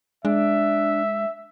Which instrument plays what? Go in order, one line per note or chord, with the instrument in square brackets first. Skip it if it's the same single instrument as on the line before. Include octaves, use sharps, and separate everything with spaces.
[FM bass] G#3 [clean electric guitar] D4 [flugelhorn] E5